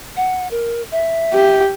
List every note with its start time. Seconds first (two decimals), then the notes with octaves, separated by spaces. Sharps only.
0.17 F#5
0.51 A#4
0.92 E5
1.33 G4